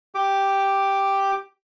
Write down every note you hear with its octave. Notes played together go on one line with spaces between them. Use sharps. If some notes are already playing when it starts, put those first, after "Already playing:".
G4 D6